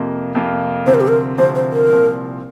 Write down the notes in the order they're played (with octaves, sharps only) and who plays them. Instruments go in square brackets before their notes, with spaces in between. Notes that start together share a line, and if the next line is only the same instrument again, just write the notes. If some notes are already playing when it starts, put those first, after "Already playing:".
Already playing: [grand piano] F2 C3 A#3 F4
F2 C3 A#3 F4
[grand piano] D2 C3 F3 C4 [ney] C5
[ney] A#4
G4
A#4
[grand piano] D2 C3 F3 C4 [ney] C5
[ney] C5
A#4
[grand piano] C2 A#2 F3 C4